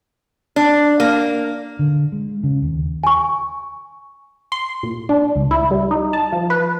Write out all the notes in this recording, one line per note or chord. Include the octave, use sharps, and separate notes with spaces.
D4
A#3
D3
G#3
C#3
D#2
G#5 C#6
C6
A#2
D4
C#2
E4
G3
D#4
A5
F3
B4